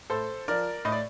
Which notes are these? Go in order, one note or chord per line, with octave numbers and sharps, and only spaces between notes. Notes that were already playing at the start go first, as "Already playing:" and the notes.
A2 A4 C5
F3 A#4 D5
A2 D#5
D5